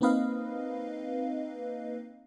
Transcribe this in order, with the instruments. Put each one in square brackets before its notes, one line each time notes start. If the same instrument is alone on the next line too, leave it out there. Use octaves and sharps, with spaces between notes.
[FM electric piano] A#3 C4 D#4 B4 D#5 F5